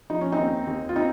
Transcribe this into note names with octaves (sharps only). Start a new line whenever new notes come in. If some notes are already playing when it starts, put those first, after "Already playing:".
F3 D#4
C#4
C4 D#4
D#2
D#2
F4
C4 D#4